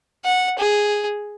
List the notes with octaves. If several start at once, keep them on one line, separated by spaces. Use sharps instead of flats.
F#5
G#4